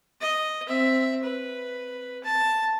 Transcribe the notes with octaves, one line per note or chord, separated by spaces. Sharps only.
D#5
C4 E5
B4
A5